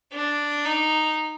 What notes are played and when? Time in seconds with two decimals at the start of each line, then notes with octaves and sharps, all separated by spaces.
0.13 D4
0.65 D#4